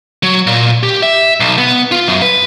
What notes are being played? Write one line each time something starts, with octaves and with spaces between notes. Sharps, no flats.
F#3
A#2
G4
E5
B1
B3
F4
F#2
B4